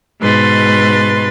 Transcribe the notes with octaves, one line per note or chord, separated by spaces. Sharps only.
G#2 B2 B4 C6 A6